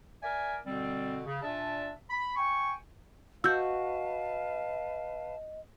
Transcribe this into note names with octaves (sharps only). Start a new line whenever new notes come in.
A#4 D5 E5 G#5
B2 D3 G3 C4
C#3
A#2 D4 D5 E5 A5
B5
G5 G#5 C#6
F#4 B4 D#5 F5 A5 E6 G6